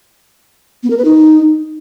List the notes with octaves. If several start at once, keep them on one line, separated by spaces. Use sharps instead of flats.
B3
A#4
B4
D#4